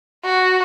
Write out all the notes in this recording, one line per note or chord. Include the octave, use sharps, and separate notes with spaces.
F#4